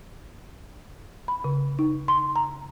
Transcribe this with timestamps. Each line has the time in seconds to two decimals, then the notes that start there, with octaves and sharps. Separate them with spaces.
1.28 B5
1.44 C#3
1.79 D#4
2.08 C6
2.36 A#5